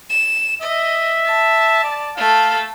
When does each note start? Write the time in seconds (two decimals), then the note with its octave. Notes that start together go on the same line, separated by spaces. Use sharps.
0.10 E7
0.62 D#5 E5
1.25 A5
1.84 D5
2.17 A3 A4 F5